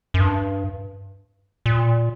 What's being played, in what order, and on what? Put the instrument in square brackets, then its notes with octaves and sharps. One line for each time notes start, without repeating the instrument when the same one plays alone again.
[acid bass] F#2
G2
A#2